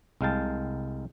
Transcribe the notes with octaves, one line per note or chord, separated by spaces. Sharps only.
C2 G#3 F5 G5 A5